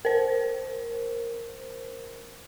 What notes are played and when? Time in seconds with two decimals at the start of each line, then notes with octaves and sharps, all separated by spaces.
0.05 A#4 C5